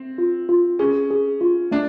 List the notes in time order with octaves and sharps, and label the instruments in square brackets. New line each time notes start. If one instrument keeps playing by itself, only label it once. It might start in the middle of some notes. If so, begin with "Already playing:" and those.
Already playing: [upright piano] C4
[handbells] F4
F4
[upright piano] C#4 [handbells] G#4
[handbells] G#4
F4
[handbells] A3 [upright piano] D4